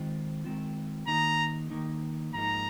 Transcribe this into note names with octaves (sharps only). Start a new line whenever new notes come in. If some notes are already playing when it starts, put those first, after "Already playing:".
Already playing: D#3 G#3 C4 F4
D#3 G#3 C4 F4
D#3 A#3 D#4 A#5
D#3 A#3 D#4
G#2 F3 A#3 D#4 A#5